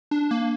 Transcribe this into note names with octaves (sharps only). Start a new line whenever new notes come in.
D4
A#3